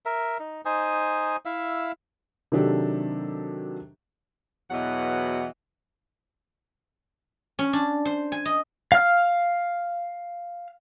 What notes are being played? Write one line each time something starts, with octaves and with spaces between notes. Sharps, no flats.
A#4 E5
D#4
D#4 C5 G#5 D#6
E4 E5 F5 E6
C3 D#3 F#3 D4 G4 A4
E2 B2 E3 F#3 D#5 F#5
C#4
D4
C5
G#5
D#5
F5 F6